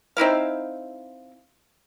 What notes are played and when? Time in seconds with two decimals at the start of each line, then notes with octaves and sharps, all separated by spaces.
0.17 C4 D#4 E4 F5